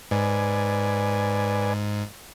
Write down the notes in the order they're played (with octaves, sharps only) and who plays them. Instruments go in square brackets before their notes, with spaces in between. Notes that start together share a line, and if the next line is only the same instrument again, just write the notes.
[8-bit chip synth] G#2 [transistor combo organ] B4 D5 G#5